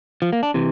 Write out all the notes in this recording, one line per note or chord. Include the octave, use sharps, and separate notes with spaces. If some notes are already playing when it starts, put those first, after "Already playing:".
F3
A#3
D4
C3 E3